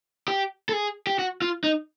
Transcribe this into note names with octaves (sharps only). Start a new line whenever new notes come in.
G4
A4
G#4
G4
F#4
F4
D#4